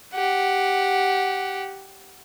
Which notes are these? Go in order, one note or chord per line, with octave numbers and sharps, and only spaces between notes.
G4 F#5